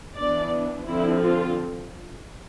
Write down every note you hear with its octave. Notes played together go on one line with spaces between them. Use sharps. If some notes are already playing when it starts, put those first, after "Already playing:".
E3 B3 D4 D5
D3 F3 C4 E4
F4